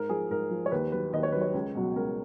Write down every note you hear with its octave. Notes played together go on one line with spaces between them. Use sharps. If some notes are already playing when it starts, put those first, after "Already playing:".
Already playing: G#2 A#4
F3 G#4
G#2 A#4
F3
C#5
D#2 B4
D#3 F#3 B4
D#2 D#5
C#5
D#3 F#3 B4
C#5
C#2
B2 F#3
C#2 A#4